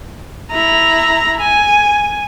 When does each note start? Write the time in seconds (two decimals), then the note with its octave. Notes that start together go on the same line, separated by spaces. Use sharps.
0.51 E4 A#5
1.41 G#5